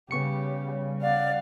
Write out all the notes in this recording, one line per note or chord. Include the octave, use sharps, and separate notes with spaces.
C#3 G3 B3 G4 C#6 C#7
D5 F5 F#5